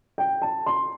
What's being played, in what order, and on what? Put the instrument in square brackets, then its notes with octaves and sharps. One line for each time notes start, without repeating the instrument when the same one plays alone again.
[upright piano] G5
A5
C6